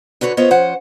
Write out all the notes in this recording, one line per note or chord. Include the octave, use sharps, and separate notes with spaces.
D3 F#4 B4 C#5
B3 F4 C5 C#5 D#5
F3 C#4 C5 F#5